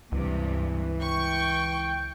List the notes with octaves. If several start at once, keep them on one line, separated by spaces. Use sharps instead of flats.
C#2 G2 C3 E3
G5 C#6